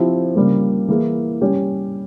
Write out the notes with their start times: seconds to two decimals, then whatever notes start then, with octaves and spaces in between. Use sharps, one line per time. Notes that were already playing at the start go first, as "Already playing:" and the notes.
Already playing: F3 C4 E4 G4
0.35 C#3 G3 A#3
0.88 E3 A#3 E4 G#4
1.41 G3 C#4 G4